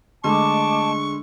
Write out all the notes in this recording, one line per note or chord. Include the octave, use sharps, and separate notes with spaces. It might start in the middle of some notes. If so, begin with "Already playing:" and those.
D3 G#3 A3 D#5 A5 C#6 D6